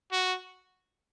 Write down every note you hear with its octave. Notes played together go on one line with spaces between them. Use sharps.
F#4